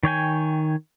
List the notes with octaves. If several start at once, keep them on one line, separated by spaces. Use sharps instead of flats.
D#3 C#5 G5 G#5